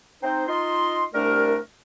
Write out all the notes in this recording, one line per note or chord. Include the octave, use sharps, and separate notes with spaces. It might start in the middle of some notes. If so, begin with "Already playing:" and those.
C4 D#4 C5
D#4 F4 D#5 C6
C2 G3 A3 D4 A#4